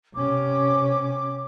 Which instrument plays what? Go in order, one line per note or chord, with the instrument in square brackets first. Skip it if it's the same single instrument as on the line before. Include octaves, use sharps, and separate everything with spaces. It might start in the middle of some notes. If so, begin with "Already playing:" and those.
[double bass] C3 C#4 [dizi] D6